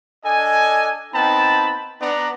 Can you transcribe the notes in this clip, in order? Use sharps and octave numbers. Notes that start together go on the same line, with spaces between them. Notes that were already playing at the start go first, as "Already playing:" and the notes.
D4 A4 D#5 G#5
B3 C4 D#4 G5 A5 B5
B3 D4 D5 A#5